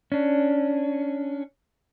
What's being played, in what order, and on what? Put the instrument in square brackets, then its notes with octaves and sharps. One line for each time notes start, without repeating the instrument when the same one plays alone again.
[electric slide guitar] C#4 D4